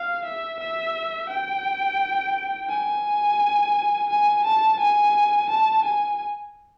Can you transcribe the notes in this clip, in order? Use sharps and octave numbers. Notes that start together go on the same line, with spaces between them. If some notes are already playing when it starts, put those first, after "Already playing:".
Already playing: F5
E5
E5
G5
G#5
G#5
A5
G#5
A5
G#5